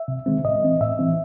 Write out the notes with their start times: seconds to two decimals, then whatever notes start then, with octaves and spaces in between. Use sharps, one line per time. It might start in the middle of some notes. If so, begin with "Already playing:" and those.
Already playing: E5
0.08 C3
0.26 D#3 G#3 C4
0.45 A2 D#5
0.63 E3 C4
0.81 A2 E5
0.99 E3 C4